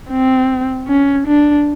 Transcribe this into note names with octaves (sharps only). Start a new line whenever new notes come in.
C4
C#4
D4